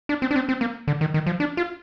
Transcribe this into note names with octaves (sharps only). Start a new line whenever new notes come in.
D4
C4
D4
C4
C4
A#3
D3
D#3
D#3
F3
D4
F4